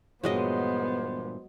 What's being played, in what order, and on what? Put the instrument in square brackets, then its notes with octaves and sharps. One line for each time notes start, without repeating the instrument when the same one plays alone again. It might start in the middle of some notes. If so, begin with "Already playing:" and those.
[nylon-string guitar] G2 A#2 E3 [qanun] F#3 G#3 D#5 [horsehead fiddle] B3 [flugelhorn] C5